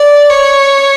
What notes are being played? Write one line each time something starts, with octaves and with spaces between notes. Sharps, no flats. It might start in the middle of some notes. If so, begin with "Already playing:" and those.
Already playing: D5
C#5